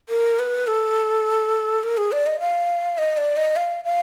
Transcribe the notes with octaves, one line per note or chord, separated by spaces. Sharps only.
A#4
B4
A4
A#4
G#4
D5
D#5
F5
D#5
D5
D#5
F5
F5